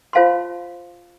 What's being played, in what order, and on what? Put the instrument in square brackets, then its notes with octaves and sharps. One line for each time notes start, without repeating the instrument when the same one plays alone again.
[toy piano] F4 C5 F5 A5 C6